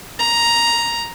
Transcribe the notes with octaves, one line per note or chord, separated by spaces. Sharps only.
A#5